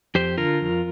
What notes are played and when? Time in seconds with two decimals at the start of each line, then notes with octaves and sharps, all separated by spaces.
0.15 F2 G4 C5
0.38 D3 F4 A#4
0.61 F2